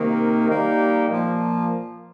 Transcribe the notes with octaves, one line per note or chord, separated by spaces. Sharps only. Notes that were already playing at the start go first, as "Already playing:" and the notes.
Already playing: C3 D#3 A#3
G3 A#3 D#4 G4
A#2 F3 A#3